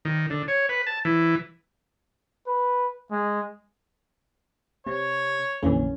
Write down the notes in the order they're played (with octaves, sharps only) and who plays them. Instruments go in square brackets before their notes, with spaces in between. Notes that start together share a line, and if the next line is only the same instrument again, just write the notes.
[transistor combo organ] D#3
D3
C#5
B4
A5
E3
[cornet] B4
G#3
[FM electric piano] C3 [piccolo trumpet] C#5
[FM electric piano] A#1 D3 A#3 [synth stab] F2 E3 [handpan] C#4